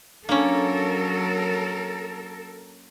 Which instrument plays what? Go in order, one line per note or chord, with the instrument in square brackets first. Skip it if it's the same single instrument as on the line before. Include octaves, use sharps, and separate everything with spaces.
[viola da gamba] F#3 [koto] A#3 C#4 [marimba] D4 [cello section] A4 A#4